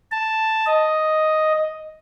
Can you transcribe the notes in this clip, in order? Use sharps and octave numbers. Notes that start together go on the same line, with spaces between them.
A5
D#5